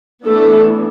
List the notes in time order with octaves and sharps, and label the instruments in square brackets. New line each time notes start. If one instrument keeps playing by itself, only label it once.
[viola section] E3 A3 B3 D4 A4